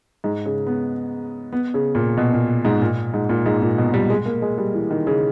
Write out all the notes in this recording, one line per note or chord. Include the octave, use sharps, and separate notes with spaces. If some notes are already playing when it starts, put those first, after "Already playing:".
G#2
C#3
B3
B3
C#3
A#2
B2
A#2
G#2
A#2
G#2
A#2
G#2
A#2
B2
G3
G#3
A#3
G#3
G3
E3
D#3
C#3